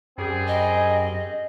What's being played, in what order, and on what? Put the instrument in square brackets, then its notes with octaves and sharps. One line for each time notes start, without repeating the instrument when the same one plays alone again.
[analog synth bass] F#2 [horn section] G3 C4 G#4
[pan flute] D#5